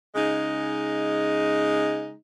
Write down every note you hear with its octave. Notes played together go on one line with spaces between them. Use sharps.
C#3 G#3 D#4